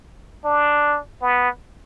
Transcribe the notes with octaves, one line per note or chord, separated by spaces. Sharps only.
D4
B3